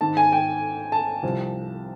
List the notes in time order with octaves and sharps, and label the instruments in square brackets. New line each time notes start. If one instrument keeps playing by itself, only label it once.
[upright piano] G#2 D#3 A5
G#5
G5
A5
C2 C3 F3